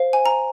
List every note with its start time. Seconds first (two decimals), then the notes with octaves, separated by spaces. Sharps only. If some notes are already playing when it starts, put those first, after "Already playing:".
Already playing: C5 F5
0.13 G#5
0.26 A#5